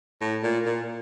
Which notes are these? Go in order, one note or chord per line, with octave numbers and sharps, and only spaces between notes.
A2
A#2
A#2